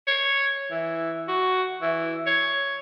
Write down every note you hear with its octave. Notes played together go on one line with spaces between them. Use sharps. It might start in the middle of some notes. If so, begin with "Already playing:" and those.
C#5
E3
F#4
E3
C#5